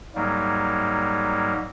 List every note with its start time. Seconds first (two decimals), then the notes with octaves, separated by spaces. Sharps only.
0.15 G#2 F#3 G3 A#3